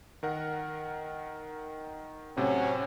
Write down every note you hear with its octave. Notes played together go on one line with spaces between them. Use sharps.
D#3 A#4 F#5
A2 C3 F#3 C4 C#4